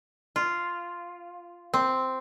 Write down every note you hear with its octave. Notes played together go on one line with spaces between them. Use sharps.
F4
C4